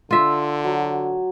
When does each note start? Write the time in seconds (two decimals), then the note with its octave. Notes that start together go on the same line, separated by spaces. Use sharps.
0.11 D3 F4 E5
0.64 F#3